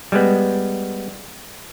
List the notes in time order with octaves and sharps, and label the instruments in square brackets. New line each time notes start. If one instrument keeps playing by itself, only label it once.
[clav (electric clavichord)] G3 G#3 B3